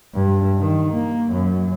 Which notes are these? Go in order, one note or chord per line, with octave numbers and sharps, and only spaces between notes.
G2
D#3
A#3
F#2